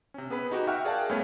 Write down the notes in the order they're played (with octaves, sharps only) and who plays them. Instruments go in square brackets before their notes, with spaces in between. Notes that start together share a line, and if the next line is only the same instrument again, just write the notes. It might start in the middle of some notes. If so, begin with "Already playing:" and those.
[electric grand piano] C3 C#4
B3 G#4 B4 B5
D#4 F#4 G4
E5 F#5 G5 C#6 F6 F#6
G#4 A#4 D5 F5 G5 A5
G2 A3 B3 C#4 C#5 G#6